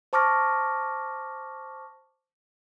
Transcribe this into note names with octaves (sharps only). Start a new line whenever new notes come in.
C5 A5 C#6 D6 F6 A#6